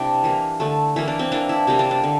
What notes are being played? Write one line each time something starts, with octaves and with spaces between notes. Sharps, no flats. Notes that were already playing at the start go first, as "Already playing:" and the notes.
Already playing: C3 G3 D4 E4 G4
E3 A#3
D3 A3
E3 A#3 E4
D4
C4
E3 A#3 D4
E4
C3 G3 A#3
D4
D4
D3